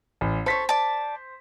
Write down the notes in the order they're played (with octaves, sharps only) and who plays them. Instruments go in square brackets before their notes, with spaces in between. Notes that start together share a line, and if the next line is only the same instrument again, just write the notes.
[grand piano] A1
[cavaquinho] A4 C#5 [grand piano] C5 B6
[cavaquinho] D5 A5